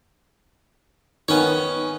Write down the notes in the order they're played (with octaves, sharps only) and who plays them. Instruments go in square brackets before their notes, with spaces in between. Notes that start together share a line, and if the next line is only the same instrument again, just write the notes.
[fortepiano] D#3 [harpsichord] B3 C#4 C#5